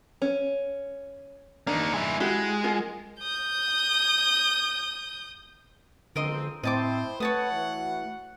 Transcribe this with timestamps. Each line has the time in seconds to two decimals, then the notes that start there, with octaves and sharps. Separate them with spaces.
0.22 C#4
1.67 A#3 D4 D#4
1.94 G#3 E4
2.20 G#3 E4 F#4 G4
2.64 F4 A#4 F#5
3.20 D#6 G6
6.16 B1 D3 F3 G#3 C4 A#4 D#5 C6
6.63 A2 C4 E4 C5 D#5 A5 D6
7.20 A3 F#4 B4 C#5 F#5 A5 D#6
7.51 E3 E4